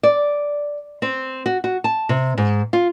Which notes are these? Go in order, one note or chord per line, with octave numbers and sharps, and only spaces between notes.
D5
C4
F#4
F#4
A5
C3
G#2
F4